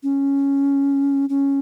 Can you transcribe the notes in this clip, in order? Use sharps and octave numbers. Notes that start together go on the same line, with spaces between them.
C#4
C#4